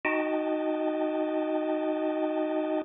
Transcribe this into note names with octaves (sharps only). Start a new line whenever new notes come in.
D#4 F#4 D#5 G5 A5